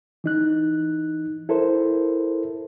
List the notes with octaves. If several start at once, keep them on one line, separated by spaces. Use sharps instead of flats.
E3 D#4 F#6
E4 A4 A#4 C5